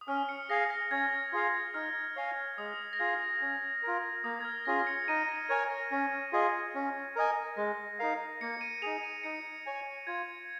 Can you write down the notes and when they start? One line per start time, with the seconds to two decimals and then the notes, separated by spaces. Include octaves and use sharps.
0.01 D#6
0.08 C#4 F6
0.29 C#7
0.50 G#4 F5 G#5 A#6
0.70 A#6
0.91 C#4 G#6
1.33 F4 G#4 F5
1.74 D#4 F6
2.16 C#5 F5 G#5
2.58 G#3 D#6
2.93 A#6
2.99 F4 G#4 F5 G#6
3.41 C#4
3.83 F4 A#4
4.24 A#3 D#6
4.41 G#6
4.45 F6
4.65 C#4 F4 G#4 A#6
4.79 A#6
4.87 C#7
5.08 D#4 D#7
5.29 A#6
5.49 A#4 C#5 G#5 G#6
5.70 A#6
5.91 C#4
6.33 F4 G#4 D#5
6.75 C#4
7.16 A#4 D#5 G#5
7.57 G#3 A#6
7.99 D#4 A#4 F5
8.41 A#3 C#7
8.61 D#7
8.82 D#4 G#4 F7
9.03 D#7
9.24 D#4 C#7
9.66 C#5 G#5
10.07 F4 G#6